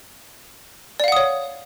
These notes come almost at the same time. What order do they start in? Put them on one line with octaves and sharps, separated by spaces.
D5 F5 F#5 D#6 C#5